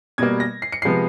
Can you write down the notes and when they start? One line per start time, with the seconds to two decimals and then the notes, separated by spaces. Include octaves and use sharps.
0.18 B2 G3 A#3 G#6
0.40 A#6
0.62 C7
0.72 C#7
0.82 C3 F3 G#3 B3 C7